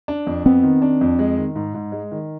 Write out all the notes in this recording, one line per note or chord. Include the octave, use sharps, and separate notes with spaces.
D4
F2
B3 C4
D#3
D4
F2
G#3
D#3
G#2
G#2
G#3
D#3